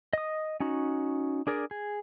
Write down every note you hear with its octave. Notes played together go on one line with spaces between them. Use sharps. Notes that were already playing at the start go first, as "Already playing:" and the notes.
D#5 D#6
C#4 D#4 F#4
D4 G#4 A#4 D5
G#4